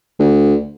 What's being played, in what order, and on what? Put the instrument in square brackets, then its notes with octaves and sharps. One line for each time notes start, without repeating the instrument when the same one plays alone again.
[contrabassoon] D2